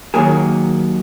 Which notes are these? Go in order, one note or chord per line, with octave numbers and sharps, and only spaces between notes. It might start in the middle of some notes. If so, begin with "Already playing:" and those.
D#2 D#3 F#3 A#3 G#4